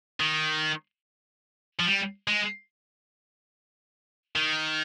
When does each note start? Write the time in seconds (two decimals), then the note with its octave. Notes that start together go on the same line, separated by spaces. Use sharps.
0.20 D#3
1.80 F3
1.86 G3
2.28 G#3
4.35 D#3